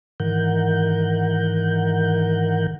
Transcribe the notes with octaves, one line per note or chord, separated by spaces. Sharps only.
G#2 D#3 E3 A#4 F#5 G6